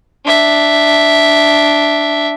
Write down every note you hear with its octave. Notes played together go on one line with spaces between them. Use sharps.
D4 E5